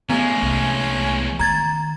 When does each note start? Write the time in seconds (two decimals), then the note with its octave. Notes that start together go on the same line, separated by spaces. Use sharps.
0.10 E3 G#3 A3 B3 C#4
0.42 C2
1.39 D#3 A#5 G#6 A6